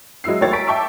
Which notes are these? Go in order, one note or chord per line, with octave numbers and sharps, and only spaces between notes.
F#3 G#3 E4 E6 C7
D#2 F#3 A3 E4 C#5 A6
G#5 A#5 C#6 B6 D7
E5 G5 A5 C#6 D6 E6